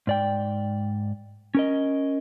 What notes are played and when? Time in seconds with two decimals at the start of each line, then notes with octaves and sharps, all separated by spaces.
0.07 G#2 D5 G5
1.55 C#4 A#4 D#5